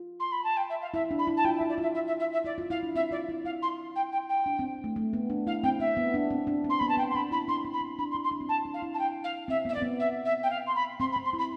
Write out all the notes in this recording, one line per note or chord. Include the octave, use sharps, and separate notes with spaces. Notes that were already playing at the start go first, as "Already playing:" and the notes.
Already playing: F4
C6
B5
A5
G5
E5
F5
E4 E5
D4
B5
E4
A5
F4 G5
E5
E4
D5
F4 E5
E5
E5
E5
E5
E4 D5
F4
E4 F5
D4
C4 E5
F4 D5
E4
E4 F5
C6
G5
G5
G5
D4
C4
A3
A3
B3
D4
E4 F5
C4 G5
C4 E5
B3
D4
C4
D4
C4 C6
B3 B5
A5
C4 G5
C6
D4 B5
E4 B5
D4 C6
C4
B5
C4
D4 B5
C6
E4
C6
D4
C4
D4 A5
D4
F5
E4
A5
G5
F5
C4 E5
B3 E5
D5
C4
B3
E5
E5
G5
F5
C6
B5
C4 C6
B5
C4
C6
E4 B5